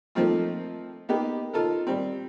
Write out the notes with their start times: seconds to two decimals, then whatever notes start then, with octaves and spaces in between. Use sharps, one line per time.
0.15 F3 A3 A#3 C4 D#4 F4
1.09 A#3 B3 D#4 G4
1.53 D#4 F4 A4 A#4
1.87 G3 C4